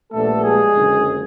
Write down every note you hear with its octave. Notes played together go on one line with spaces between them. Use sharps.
A#1 A#2 G3 A3 B3 D4 A4
G#3 G#4
F#1 F2 D3